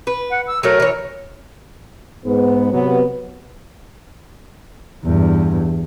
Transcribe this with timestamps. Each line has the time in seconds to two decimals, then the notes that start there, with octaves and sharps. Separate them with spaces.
0.07 B4
0.30 F#5
0.47 E6
0.63 F#3 A3 A#4 C#5
0.80 E3 C#5
2.24 G#2 B3
2.71 C3 F#3 B3
5.05 E2 G2